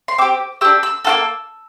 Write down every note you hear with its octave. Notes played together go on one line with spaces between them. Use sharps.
C6
C4 G4 D6
D4 G4 E6
E6
A#3 F4 A4 E6